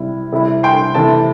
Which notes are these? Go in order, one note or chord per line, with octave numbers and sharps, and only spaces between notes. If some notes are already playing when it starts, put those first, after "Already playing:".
Already playing: C3 G3 E4
C3 G3 E4
G5 C6
C3 E3 A3 A5